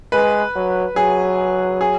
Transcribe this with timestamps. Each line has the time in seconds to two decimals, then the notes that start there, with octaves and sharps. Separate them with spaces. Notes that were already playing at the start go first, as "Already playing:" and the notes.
0.12 G#3 B4
0.55 F#3
0.96 F#3 G#4
1.81 G#4